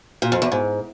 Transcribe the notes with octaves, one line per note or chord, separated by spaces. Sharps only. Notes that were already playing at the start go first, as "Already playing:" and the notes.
A#2
F2
E2
G#2